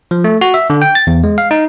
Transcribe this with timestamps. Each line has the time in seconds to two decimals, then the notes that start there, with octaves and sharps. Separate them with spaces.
0.11 F3
0.24 A3
0.41 F#4
0.54 E5
0.70 D3
0.82 G5
0.95 A6
1.07 E2
1.24 G#3
1.38 F5
1.51 D#4